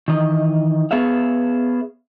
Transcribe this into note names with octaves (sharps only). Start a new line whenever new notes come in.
D#3 E3 D#5
B3 G#4 C#5 E5 F5